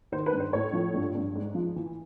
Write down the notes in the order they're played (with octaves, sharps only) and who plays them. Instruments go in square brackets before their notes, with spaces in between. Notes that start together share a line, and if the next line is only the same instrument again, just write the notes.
[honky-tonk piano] D#3 C5
B4
G2
C5
A2 C#5
F3
G2
G2
G#2
F3
E3